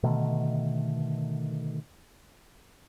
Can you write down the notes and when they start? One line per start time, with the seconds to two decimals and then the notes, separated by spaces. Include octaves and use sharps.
0.03 B2 D3 D#3 A3